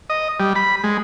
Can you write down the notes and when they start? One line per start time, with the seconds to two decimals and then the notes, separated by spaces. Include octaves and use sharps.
0.10 D#5
0.40 G3
0.56 B5
0.84 G#3